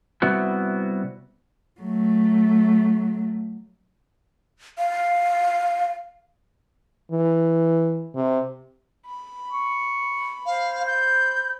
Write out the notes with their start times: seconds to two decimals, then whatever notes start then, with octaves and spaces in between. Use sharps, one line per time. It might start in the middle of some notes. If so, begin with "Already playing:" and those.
0.22 C3 G3 B3 E4 F#4
1.81 F#3 A3
4.78 F5
7.12 E3
8.15 C3
9.06 B5
9.52 C#6
10.46 C5 F5
10.87 G6